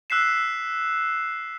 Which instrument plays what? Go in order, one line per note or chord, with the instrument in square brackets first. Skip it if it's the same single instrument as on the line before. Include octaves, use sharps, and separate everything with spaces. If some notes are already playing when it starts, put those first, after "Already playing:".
[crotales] E6 F#6 B6 C7 E7